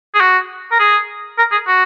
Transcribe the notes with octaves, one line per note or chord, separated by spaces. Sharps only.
G#4
F#4
A#4
G#4
A#4
G#4
F#4